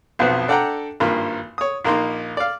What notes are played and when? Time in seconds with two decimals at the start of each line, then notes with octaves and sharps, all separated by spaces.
0.19 B1 F2 B2 B3 C5
0.48 D4 A4 D5 F#5 G5 A#5
1.00 G#1 G2 A#3 F4
1.58 C#5 D#6
1.85 A#1 A#3 D#4 C6
2.37 D5 F5